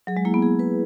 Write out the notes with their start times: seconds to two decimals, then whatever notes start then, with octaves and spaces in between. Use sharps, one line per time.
0.07 F#3 G#4
0.17 G#3
0.25 A#3 E4
0.34 B3
0.42 G#4
0.59 B4